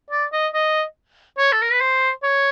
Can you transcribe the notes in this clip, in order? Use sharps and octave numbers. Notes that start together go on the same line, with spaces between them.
D5
D#5
D#5
C#5
A4
A#4
B4
C5
C#5